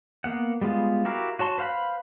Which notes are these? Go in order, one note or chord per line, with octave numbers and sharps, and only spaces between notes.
A#3 B3 F#5
G3 G#3 B3 F4
E4 F#4 G4 A#4 F5
F#4 C#5 A5 C6
B4 C5 F5 F#5 B5